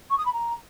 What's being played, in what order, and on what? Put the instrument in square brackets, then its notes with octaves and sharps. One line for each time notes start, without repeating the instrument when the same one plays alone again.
[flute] C#6
D#6
B5
A#5